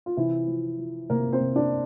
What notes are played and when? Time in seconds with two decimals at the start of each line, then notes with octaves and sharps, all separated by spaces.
0.06 F4
0.17 C3 E3 E4
0.47 F3
0.79 F3
1.10 C3 A#3 A#4
1.33 C4 C5
1.40 C3
1.56 D4 D5